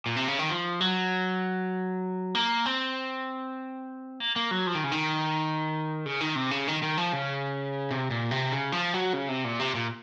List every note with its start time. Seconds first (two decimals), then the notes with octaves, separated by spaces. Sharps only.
0.06 A#2
0.16 C3
0.28 C#3
0.39 D#3
0.49 F3
0.81 F#3
2.35 A#3
2.66 C4
4.20 A#3
4.36 A#3
4.51 F#3
4.67 F3
4.75 D#3
4.84 C#3
4.92 D#3
6.06 C#3
6.21 D#3
6.36 C3
6.51 C#3
6.68 D#3
6.83 D#3
6.97 F3
7.13 C#3
7.91 C3
8.11 A#2
8.31 C3
8.52 C#3
8.72 F3
8.94 F#3
9.13 C#3
9.29 C3
9.44 A#2
9.59 C3
9.75 A#2